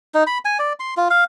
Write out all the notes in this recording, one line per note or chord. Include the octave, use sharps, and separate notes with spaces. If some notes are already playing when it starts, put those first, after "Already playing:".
D#4
B5
G#5
D5
C6
F4
F5